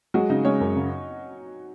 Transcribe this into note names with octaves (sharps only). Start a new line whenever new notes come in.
F#3 G#3 F#4
C#3 D#4
G#3 C#4 C#5
F#2
C#3